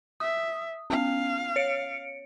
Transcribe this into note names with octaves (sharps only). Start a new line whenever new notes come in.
E5 D#6
B3 C#4 F5
C#5 C#7 D7